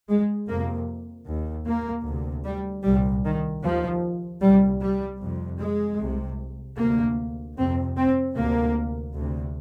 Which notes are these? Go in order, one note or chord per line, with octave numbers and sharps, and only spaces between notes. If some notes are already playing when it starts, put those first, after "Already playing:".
G#3
F2 C3 A#3
D#2
A#3
D2 C3
G3
C2 A#2 G3
D#3
D#2 F3
C2 A#2 G3
G3
F2 C3
G#3
C2 C3
D2 C3 A#3
F2 C3 C4
C4
D2 C3 A#3
D2 C3